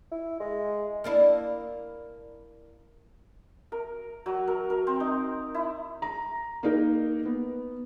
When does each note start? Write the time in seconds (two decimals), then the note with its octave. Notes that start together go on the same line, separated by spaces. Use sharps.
0.11 E4
0.40 G#3
1.04 A#3 D4 E4
3.72 A#4
4.26 F#3
4.48 A#4
4.70 A#4
4.87 C4
5.00 D#4
5.54 E4
6.02 A#5
6.63 A#3 D#4 A#4
7.25 B3